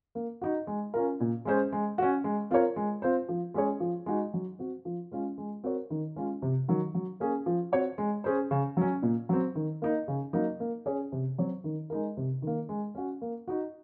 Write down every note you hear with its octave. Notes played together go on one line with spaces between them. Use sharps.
A#3
D#4 F#4
G#3
C#4 F4 A#4
A#2
G#3 C#4 G#4 C5
G#3
C#4 F#4
G#3
C4 F4 A#4 C#5
G#3
C4 F4 C5
F3
G#3 C#4 G#4 C#5
F3
G#3 D#4 F#4
F#3
C4 F#4
F3
G#3 C#4 F4
G#3
C4 F#4 A#4 C#5
D#3
G#3 C#4 F4
C3
D#3 F#3
F#3
A#3 C#4 G#4
F3
C4 F#4 C#5
G#3
C#4 G#4 C5
C#3
F#3 C#4
A#2
F#3 C4
D#3
A#3 D#4
C#3
F#3 A#3 D#4
A#3
C#4 G#4 C#5
C3
F#3 C4 F#4 C#5
D#3
G#3 D#4 A#4
C3
D#3 A#3
G#3
C#4 F#4
A#3
D#4 F#4